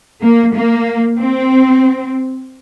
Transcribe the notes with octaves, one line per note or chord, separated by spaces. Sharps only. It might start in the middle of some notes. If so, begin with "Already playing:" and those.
A#3
A#3
C4